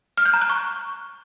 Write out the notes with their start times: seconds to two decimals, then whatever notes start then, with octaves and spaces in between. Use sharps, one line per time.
0.17 F6
0.26 G6
0.34 A#5
0.42 F#6
0.50 C#6